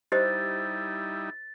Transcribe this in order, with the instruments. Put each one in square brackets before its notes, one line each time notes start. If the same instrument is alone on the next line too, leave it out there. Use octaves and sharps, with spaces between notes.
[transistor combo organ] G3 D#4 E4 [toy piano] G4 C5 D#5 [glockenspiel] A6